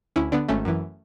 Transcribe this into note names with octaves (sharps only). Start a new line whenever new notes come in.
D2 C#4 E4
D3 B3 D4
G#1 A3 C#4
F#2 E3